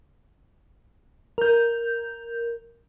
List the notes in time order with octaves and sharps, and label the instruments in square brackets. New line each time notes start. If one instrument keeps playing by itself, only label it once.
[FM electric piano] A#4 G6